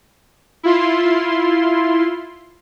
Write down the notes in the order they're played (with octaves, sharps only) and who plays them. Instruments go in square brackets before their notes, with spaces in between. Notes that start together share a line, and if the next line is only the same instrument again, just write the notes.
[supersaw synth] E4 F4 C6